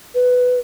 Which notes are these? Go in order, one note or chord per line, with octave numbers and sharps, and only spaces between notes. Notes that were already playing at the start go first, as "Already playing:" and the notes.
B4